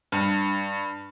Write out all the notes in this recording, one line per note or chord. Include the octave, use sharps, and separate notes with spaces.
G2